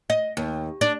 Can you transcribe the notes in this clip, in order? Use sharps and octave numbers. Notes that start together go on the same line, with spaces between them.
D#5
D#2
D4